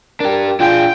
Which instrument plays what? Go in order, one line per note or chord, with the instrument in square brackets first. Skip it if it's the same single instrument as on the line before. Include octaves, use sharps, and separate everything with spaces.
[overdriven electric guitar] D4 G4 [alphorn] A#4
[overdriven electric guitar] D4 G#4 [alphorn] F4 [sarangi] G5